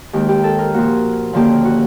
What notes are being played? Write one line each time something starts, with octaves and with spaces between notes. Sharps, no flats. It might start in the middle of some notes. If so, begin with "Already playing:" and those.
D#2 D#3 G#3 C4 G4
G4
A4
A#4
A#2 F3 A#3 F#4
D#2 D3 F3 A#3 C#4 G4
F#4